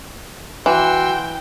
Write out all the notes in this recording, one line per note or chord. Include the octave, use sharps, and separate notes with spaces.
E3 F#4 G5 C6 E6